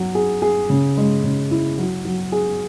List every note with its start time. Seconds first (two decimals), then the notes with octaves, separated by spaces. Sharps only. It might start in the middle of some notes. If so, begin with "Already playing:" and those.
Already playing: F#3
0.15 G#4
0.42 G#4
0.70 C#3
0.97 G#3
1.24 C#3
1.51 E4
1.78 F#3
2.05 F#3
2.32 G#4